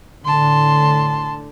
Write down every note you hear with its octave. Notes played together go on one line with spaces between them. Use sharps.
A2 D3 A5 C6